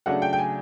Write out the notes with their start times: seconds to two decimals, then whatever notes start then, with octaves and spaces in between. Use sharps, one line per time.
0.06 C#3 F#3 A3 D4 F#5
0.22 G5
0.33 G5
0.38 G#5